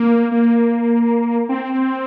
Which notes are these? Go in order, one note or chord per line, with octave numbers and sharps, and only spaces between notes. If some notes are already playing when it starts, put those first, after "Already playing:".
Already playing: A#3
A#3
C4